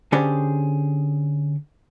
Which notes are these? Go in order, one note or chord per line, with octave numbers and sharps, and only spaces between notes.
D3 C#4 G4 G#4 C5 D5